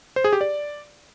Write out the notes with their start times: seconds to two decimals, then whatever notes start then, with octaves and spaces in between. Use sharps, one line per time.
0.16 C5
0.24 G#4
0.33 G4
0.41 D5